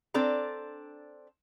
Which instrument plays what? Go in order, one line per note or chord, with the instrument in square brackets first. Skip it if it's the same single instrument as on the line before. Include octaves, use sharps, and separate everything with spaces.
[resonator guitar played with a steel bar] C4 D4 A4 D5 A#5